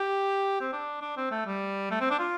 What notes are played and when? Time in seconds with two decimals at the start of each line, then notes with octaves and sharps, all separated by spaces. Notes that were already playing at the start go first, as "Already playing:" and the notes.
Already playing: G4
0.61 C4
0.73 D4
1.01 D4
1.17 C4
1.31 A3
1.46 G3
1.91 A3
2.00 C4
2.10 D4
2.19 F4